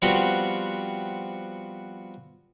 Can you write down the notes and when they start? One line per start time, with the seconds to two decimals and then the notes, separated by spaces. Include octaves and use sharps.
0.02 F3 G3 B3 C4 F#4 G4